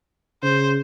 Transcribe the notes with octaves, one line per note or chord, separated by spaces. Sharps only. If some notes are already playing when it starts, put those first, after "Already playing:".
C#3 C5